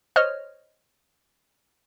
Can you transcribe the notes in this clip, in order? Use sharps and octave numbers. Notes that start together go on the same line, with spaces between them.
C5 C#5 D#5 F6